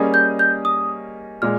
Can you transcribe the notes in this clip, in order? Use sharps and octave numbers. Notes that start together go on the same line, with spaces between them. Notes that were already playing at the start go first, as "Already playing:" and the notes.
Already playing: G3 A#3 C#4 G#4 D#5
G6
G6
D#6
A#2 G#3 F6